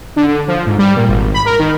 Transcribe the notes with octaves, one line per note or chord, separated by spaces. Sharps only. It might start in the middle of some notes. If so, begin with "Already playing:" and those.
D3
D3
F3
G#2
G3
A#2
G#1
B5
A#4
D#3